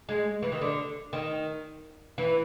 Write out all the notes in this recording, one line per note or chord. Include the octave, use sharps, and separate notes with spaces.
G#3
E3
D#3
D3
D#3
E3